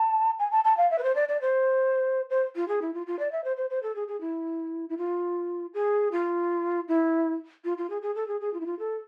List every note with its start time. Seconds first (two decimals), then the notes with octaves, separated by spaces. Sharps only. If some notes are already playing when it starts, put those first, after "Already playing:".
Already playing: A5
0.39 G#5
0.51 A5
0.64 A5
0.77 F5
0.91 E5
0.98 B4
1.03 C5
1.15 D5
1.28 D5
1.41 C5
2.30 C5
2.56 F4
2.68 G#4
2.82 E4
2.94 F4
3.07 F4
3.19 D5
3.32 E5
3.44 C5
3.57 C5
3.70 C5
3.83 A4
3.95 G#4
4.08 G#4
4.21 E4
4.89 E4
4.98 F4
5.74 G#4
6.12 F4
6.88 E4
7.64 F4
7.77 F4
7.90 G#4
8.02 G#4
8.15 A4
8.28 G#4
8.41 G#4
8.54 F4
8.60 E4
8.66 F4
8.79 A4